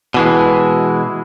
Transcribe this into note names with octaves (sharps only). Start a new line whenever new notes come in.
B2 E3 G#3